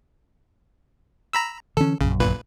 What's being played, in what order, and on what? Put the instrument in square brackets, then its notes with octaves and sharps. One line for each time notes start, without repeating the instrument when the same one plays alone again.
[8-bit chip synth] A#5 B5 E6
[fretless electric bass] D3 E3 C#4 [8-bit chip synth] A4
[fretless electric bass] A#1 F#2 [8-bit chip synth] C#3
[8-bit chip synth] G1 A#2 B4